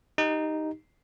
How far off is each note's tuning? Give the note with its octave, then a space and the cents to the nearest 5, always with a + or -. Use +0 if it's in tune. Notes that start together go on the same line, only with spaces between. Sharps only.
D#4 +0 G4 +0